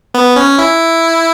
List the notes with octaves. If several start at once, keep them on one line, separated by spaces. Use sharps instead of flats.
B3
C#4
E4